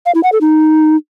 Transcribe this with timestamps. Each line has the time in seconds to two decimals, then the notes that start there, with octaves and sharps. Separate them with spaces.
0.06 F5
0.15 E4
0.23 F#5
0.32 A4
0.41 D#4